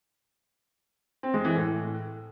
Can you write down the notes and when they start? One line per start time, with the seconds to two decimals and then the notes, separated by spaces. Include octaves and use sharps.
1.23 C4
1.34 G#3
1.45 E3
1.55 A2